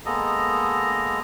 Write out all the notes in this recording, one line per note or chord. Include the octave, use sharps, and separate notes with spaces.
G#3 A#3 B3 A4 D#5 A#5